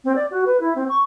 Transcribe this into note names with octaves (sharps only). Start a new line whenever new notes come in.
C4
D5
F#4
B4
E4
C4
C#6